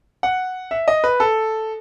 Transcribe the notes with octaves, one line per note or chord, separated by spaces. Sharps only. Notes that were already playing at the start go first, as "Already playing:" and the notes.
F#5
E5
D#5
B4
A4